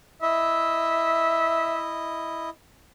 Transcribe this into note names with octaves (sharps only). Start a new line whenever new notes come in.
E4 D#5 E5